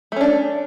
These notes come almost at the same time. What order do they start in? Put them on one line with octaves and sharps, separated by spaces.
A3 C#4 D4